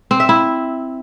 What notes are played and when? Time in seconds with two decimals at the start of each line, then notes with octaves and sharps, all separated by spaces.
0.11 C4
0.20 E5
0.29 E4